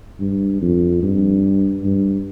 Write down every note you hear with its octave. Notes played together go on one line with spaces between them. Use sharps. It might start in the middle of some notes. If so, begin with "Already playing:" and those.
G2
F2
G2
G2